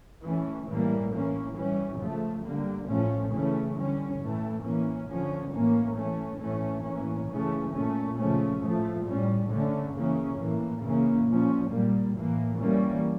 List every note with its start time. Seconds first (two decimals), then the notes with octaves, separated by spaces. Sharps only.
0.23 E3 A3 C#4
0.67 A2 E3 G3 A#3
1.12 E3 A#3 C#4
1.55 E3 G3 C#4
1.99 C#3 F3 A3
2.43 D3 G3 A#3
2.87 A2 F3 A3 C#4
3.32 C#3 E3 A3 C#4
3.76 D3 G3 C#4
4.20 A2 E3 A3
4.64 E3 A#3 C#4
5.09 D3 F3 C#4
5.53 A2 E3 A#3 C#4
5.97 E3 A3 C#4
6.41 A2 E3 A3 C#4
6.85 A2 E3 A#3 C#4
7.29 C#3 E3 A3 C#4
7.73 A#2 A3 C#4
8.17 C#3 F3 A3 C#4
8.61 A2 F3 A3
9.05 A2 G3 C#4
9.50 D3 A3 C#4
9.94 C#3 E3 A#3 C#4
10.38 A2 E3 A#3
10.82 C#3 E3 A#3 C#4
11.26 A#2 F3 C#4
11.70 A#2 G3 A#3
12.15 A2 E3 A#3
12.59 E3 G3 A#3 C#4